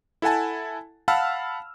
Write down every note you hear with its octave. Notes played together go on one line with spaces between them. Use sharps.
E4 A4 F#5 G#5 A5
F5 F#5 A5 B5 E6 F6